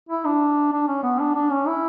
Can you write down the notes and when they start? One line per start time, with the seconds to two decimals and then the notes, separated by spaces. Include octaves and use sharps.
0.09 E4
0.25 D4
0.72 D4
0.87 C#4
1.03 B3
1.20 D4
1.35 D4
1.51 C#4
1.67 E4